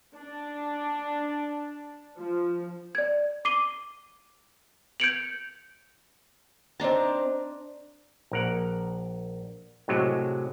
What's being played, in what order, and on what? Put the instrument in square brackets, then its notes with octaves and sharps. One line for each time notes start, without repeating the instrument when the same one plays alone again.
[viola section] D4
F3
[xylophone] D5 G#6
D6 C7 D#7 G7
G6 G#6 C#7 D7 F7 F#7
[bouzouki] C4 D#4 A#5 [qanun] D4 A5
[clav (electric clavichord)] A#1 A#4 F#5
A2 C3 F#3 G#3